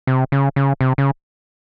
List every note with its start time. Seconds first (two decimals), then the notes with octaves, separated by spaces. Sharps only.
0.07 C3
0.32 C#3
0.56 C#3
0.81 C3
0.98 C#3